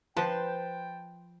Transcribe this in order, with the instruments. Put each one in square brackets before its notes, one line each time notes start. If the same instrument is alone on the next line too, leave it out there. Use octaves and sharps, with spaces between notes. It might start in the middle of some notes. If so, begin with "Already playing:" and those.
[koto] F3 [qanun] B4 C5 [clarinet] G5 [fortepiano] A5